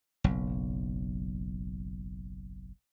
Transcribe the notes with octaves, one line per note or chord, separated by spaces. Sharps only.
F#1 B1